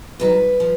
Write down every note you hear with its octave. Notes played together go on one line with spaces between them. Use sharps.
F2 D#3 F#3 B4
F3